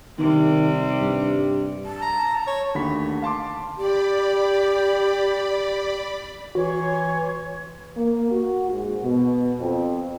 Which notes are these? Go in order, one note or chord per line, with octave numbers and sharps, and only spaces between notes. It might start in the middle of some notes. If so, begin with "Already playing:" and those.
C3 D#3 G3
G2
A5
A#5
C#5
D#2 D3 A3 F#4 B5 B6
F5 A5 C6 D6
G4 D5 B5
E3 F#4 C#5 C6
A#3
F#4
G#2
B2
F2